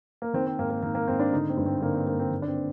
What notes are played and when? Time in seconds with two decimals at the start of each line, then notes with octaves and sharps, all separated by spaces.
0.22 A#3
0.34 D#3 C4
0.47 C4
0.59 G#2 A#3
0.70 A#3
0.83 D#3 A#3
0.95 A#3
1.08 G#2 C4
1.20 D4
1.33 D3 D#4
1.49 C4
1.57 G2
1.66 C4
1.82 D3 A#3
1.95 C4
2.06 G2 A#3
2.20 C4
2.31 D#3
2.42 D4
2.48 C4